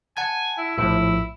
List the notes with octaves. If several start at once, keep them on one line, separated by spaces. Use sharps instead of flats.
F#5 G#5 A5 G#6
E4
A#1 A2 F3 E4